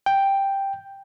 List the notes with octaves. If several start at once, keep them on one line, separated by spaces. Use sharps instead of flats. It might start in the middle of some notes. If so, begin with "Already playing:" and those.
G5